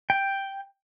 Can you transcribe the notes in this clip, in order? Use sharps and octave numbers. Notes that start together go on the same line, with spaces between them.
G5